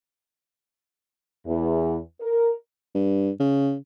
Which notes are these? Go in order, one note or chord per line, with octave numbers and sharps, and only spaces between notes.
E2
A#4
G2
C#3